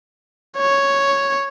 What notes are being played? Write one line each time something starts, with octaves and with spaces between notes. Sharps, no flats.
C#5